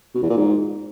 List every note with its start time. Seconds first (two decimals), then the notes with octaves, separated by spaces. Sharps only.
0.15 B2
0.22 E2
0.30 A#2
0.37 G#2